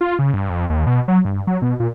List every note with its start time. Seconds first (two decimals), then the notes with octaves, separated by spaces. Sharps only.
0.01 F4
0.19 C#3
0.34 G2
0.50 F2
0.70 D#2
0.87 B2
1.08 F#3
1.25 G2
1.47 F#3
1.62 B2
1.80 A#2